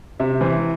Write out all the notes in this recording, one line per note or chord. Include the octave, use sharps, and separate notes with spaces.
C3 E5
E3 C5